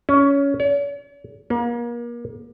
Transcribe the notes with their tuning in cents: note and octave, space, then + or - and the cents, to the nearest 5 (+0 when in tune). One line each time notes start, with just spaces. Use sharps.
C#4 +15
C#5 +45
A#3 +35